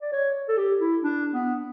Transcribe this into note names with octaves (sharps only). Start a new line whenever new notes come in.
D5
C#5
A4
G4
E4
D4
B3